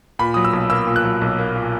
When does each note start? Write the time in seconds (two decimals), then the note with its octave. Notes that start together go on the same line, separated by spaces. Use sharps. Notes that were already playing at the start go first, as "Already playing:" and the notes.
0.19 A#2 B5
0.34 F#3 D#6
0.44 E6
0.53 B1
0.70 A#3 E6
0.87 A#2
0.96 F#6
1.04 F#3
1.21 B1
1.39 A#3
1.56 A#2